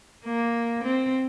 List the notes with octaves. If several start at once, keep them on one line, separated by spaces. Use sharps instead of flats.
A#3
C4